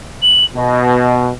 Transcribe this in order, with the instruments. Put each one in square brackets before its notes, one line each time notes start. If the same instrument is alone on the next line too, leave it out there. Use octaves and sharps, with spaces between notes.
[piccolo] F#7
[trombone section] B2 [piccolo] D#5